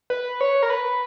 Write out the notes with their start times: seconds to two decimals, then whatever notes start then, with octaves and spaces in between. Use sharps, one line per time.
0.10 B4
0.41 C#5
0.62 A#4
0.70 B4